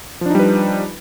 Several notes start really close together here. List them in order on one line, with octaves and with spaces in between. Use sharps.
F3 D4 D#4 G3 B4